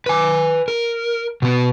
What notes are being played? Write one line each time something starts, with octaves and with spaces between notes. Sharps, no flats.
B4 G#5
A#4
B2 B3